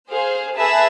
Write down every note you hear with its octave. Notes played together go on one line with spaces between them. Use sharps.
G#4 C5 F5
G#4 B4 E5 A5